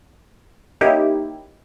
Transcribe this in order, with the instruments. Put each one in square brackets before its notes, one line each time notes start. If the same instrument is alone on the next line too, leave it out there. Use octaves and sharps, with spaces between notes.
[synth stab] A#3 C#4 D#4 E4 G4